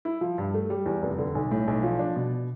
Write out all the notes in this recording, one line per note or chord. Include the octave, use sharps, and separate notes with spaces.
E4
F3
G2
A3
G3
E2
F1
D3
B1
A2
B1
F3
D4
B2